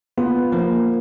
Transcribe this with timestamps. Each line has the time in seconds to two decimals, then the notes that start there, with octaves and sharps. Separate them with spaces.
0.18 B3 F4
0.52 F3 A#3